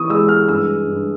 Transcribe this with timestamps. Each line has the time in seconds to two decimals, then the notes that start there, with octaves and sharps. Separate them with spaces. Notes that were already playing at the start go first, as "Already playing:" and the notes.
Already playing: E3 B3 C#6 D#6
0.09 G#3 E6
0.28 F6
0.48 G2 E6
0.87 G2